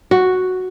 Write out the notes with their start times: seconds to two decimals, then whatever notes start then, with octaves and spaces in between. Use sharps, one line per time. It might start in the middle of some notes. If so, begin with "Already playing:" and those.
0.11 F#4